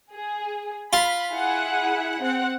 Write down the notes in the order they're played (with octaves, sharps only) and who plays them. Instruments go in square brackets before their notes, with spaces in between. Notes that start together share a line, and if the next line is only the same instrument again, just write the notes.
[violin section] G#4
[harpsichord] F4 [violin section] B5
[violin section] E4 G#4 F#5
C4 F#5